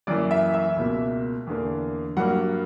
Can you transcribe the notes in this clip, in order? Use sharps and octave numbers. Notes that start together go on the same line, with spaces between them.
F#2 E3 A#3 D5
E5
E5
C#2 B2 A#3
E2 D3 A#3
G2 F#3 A#3 F#5